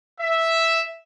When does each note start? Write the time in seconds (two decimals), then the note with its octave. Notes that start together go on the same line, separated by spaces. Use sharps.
0.21 E5